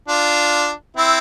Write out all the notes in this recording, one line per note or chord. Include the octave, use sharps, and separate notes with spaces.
D4 F4
C4 E4